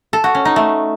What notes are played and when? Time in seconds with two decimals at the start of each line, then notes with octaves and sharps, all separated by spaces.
0.13 A4
0.24 F#4
0.35 C#4
0.45 D#4
0.56 A3